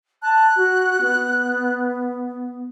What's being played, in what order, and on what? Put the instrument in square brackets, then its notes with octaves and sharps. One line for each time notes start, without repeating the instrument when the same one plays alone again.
[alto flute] A5 [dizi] F#6
[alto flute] F#4
B3